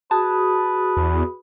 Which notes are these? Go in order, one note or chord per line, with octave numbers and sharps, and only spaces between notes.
F#4 G#4 B4 A5 D#6
E2